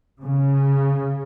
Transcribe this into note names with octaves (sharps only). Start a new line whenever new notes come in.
C#3